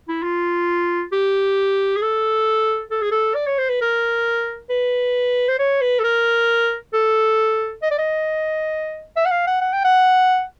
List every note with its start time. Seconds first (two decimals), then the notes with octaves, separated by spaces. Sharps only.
0.08 E4
0.23 F4
1.12 G4
1.96 G#4
2.02 A4
2.91 A4
3.02 G#4
3.11 A4
3.35 D5
3.47 C#5
3.58 C5
3.69 B4
3.81 A#4
4.70 B4
5.49 C5
5.59 C#5
5.81 B4
5.99 A4
6.04 A#4
6.93 A4
7.82 D#5
7.91 D5
7.99 D#5
9.17 E5
9.26 F#5
9.31 F5
9.47 F#5
9.61 F#5
9.73 G5
9.85 F#5